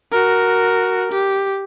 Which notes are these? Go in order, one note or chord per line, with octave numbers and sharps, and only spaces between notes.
F#4 A#4
G4